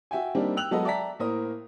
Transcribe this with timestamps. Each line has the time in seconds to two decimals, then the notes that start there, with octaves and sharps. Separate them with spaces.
0.11 F#4 E5 G5 G#5
0.35 G3 A#3 C4 D4 D#4 G4
0.57 G5 E6 F#6 F7 F#7
0.71 F#3 G#3 B3 A4 B4 D#5
0.85 D5 E5 G5 A5 A#5 B6
1.19 A2 A#3 A#4 C5 D#6